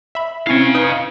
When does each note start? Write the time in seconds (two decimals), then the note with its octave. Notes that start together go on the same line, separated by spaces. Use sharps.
0.15 E5 B5
0.47 C4 C#4 E4 F5 G#5
0.75 D#4 B4 D#6